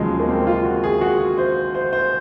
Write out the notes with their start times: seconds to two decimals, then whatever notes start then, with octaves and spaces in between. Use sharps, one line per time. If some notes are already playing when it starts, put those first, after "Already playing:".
Already playing: D#2 C#3 F3 F#3 G#3
0.20 A#3
0.29 C4
0.47 F4
0.65 F#4
0.84 G#4
1.01 F#4
1.38 C5
1.75 C5
1.93 C5